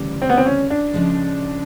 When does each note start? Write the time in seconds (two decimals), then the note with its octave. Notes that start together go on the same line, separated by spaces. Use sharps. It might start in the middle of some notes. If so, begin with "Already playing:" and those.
Already playing: D2 C#3 E3 G3
0.22 C4
0.29 B3
0.37 C4
0.46 C#4
0.70 D4
0.94 C#3 F3 G#3